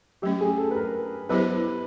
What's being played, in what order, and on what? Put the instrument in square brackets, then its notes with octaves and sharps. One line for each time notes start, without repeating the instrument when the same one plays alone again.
[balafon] F#3 A3 C#4 [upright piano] G4
[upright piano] G#4
A4
B4
A#4
[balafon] F#3 B3 E4 G4 C5 [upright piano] B4